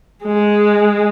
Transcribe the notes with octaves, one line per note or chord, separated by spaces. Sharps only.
G#3